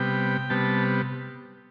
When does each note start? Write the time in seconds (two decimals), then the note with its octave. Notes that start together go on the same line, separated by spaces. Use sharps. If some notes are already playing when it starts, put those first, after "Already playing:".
Already playing: C3 G3 B3 G5
0.50 C3 G3 B3 A5